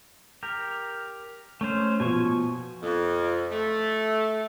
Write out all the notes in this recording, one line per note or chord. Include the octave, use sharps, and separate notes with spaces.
G4 A#4
A3 C#4 C5
B2 F3 G#5 C#6
F2
A3